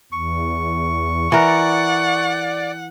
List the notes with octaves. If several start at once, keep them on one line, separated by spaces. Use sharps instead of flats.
E2 C#6
E3 A#4 D5 F#5